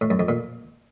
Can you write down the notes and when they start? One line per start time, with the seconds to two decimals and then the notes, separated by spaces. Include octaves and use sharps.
0.01 A2
0.10 F#2
0.19 F2
0.28 A#2